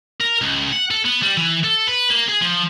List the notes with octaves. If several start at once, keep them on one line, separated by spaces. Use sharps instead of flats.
A#4
C#2
F#5
A4
B3
G3
E3
A4
B4
A#3
G#4
F3